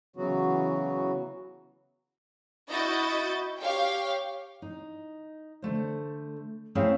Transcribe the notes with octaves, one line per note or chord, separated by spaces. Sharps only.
C#3 E3 F#3 B3 F#4
E4 F#4 D#5 G6 A6
G4 C#5 F5 G5
D#4
D3 A3 C5
A3 C4 E4 G#4 C#5 F5